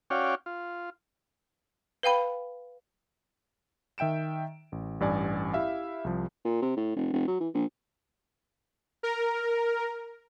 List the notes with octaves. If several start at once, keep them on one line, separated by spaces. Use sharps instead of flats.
C#4 F#4 C#5 D5 F5 G5
F4
B4 F5 G5 B5
D#3 E5 G5 D7 E7
A1
A1 G2 D5 G#5
E4 G4 E5 F5
C2 F3
A#2
C3
A2
F1
F1
F#3
E3
A#1
A#4